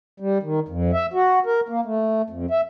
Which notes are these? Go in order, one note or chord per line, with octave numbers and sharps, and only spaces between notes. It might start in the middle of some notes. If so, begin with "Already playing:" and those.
G3
D#3
F2
E5
F#4
A#4
A#3
A3
F2
E5